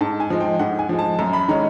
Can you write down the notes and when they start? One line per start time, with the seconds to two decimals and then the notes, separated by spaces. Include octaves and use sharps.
0.01 G#2 A5
0.20 G#5
0.30 F3 G#3
0.40 G5
0.59 G#2 F#5
0.79 G#5
0.89 F3 G#3
0.99 A5
1.19 F#2 A#5
1.33 B5
1.48 D#3 G#3 C#4 A#5